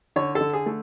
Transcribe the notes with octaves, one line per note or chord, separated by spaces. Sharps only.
D3 C#5
A4
D3
G#4
A3